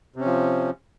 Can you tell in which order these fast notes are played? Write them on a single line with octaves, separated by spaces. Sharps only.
C3 C#4 F3